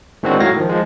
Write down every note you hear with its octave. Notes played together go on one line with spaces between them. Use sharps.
A2 D#3 G#3 C4 D4 F#4
A2 F#3 C#5 F5 A#6
D#3 F3
F3 G#3